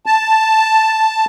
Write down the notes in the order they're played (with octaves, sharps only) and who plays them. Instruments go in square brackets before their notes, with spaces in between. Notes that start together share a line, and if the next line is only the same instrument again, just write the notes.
[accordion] A5